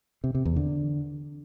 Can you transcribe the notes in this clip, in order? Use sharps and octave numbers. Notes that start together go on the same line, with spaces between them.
C3
C3
E2
D3